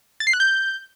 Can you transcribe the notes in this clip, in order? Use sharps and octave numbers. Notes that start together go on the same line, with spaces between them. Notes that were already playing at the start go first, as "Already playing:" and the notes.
A6
C7
F#6
G6